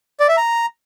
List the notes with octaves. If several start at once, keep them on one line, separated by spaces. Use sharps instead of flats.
D5
E5
A#5